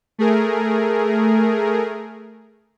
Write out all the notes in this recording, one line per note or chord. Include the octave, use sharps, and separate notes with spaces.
A3 G#4 A#4